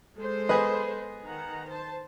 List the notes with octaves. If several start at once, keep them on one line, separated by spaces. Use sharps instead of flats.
G#3 A4 C5
B3 G#4 B4 D#5
D#3 F#5 A#5
C5 A5